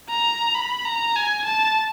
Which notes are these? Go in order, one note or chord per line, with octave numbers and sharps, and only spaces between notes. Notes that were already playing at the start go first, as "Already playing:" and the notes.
A#5
B5
A#5
G#5
A5